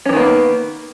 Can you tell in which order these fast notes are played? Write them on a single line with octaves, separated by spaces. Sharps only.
C#4 E3 D#3 B3 A#3